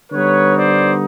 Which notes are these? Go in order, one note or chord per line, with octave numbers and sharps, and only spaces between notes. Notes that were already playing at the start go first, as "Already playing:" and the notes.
D3 G3 B3 D#4 B4 C#5
C5 D5